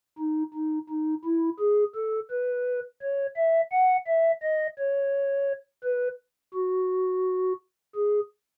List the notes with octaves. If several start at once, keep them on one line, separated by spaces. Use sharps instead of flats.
D#4
D#4
D#4
E4
G#4
A4
B4
C#5
E5
F#5
E5
D#5
C#5
B4
F#4
G#4